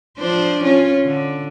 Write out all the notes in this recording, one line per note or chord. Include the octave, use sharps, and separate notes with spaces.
F3 D4 C5
C#4 F4
D3